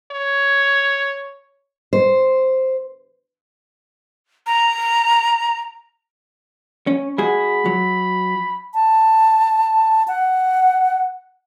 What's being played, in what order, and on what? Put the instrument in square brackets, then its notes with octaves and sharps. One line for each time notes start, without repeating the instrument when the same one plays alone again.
[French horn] C#5
[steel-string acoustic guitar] C5
[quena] A#5
[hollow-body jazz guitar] C#4
[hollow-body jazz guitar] G#3 F#4 G#4 [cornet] B5
[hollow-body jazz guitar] F#3
[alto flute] A5
F#5